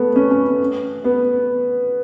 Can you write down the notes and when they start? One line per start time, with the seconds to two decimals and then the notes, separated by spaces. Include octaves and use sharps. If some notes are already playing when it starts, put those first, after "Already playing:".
Already playing: A3 B3
0.16 C#4
0.31 C#4
1.05 B3